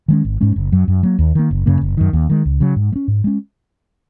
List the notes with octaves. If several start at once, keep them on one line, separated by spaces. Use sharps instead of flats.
D#3 G#3 C#4
G#1
G#2 G#3 C#4
F#1
F#2 F#3
F#2
F#3 A#3
D#2
D#3 A#3
F#1
F#2 C#3 A#3
F#1
F#2 D#3
D#2
D#3 G#3
C#2
C#3 F#3
G#2
G#3
C#4
G#2
G#3 C#4